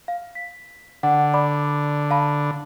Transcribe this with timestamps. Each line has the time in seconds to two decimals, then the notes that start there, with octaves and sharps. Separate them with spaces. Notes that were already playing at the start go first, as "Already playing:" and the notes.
0.08 F5
0.35 B6
1.03 D3 F#5
1.34 D5 B5 D6
2.10 F5 A5 B5